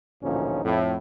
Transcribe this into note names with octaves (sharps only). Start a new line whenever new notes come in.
A1 D2 A#2 F3 C#4 D#4
F2 A2